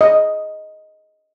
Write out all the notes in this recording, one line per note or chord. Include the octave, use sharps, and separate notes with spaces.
D#5